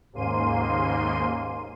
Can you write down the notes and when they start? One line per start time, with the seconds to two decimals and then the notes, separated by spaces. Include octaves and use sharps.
0.13 D#2 G#2 C#3 A#3 C6 D#7